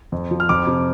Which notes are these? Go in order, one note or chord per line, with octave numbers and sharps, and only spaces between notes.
F2
F3
F6
F2 D6
C3